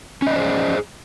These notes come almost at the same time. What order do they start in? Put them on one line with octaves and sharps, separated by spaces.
C#4 D#5 D5 C5 G#4